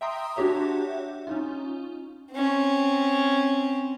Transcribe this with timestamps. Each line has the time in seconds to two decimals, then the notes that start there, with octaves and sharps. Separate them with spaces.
0.01 E5 G5 A#5 C6 D#6
0.36 D4 F#4 G4 C#5 E5
1.27 C#4 D#4 F4
2.32 C4 C#4